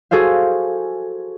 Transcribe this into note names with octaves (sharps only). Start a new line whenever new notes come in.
F#4 G#4 A4 C5 F5